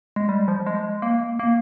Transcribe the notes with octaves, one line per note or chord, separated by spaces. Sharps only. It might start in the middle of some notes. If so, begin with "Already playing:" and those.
G#3
G3
F3
G#3
A#3
A#3